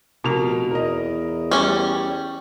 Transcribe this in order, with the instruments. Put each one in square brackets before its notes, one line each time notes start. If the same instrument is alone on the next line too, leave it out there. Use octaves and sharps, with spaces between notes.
[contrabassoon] F1 [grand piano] B2 A#4 F7
[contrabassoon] E2 [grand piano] A#4 D#5
[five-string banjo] G3 C#4